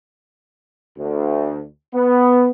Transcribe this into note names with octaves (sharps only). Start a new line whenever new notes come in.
D2
B3